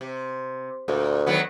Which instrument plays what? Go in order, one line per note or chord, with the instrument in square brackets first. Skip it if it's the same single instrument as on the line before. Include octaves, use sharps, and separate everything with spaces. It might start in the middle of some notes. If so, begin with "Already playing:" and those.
[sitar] C3
[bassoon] D2 [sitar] A#2
[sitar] D#3 F#3 B3